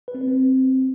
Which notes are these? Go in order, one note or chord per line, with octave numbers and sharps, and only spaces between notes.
B4
C4
B4
C4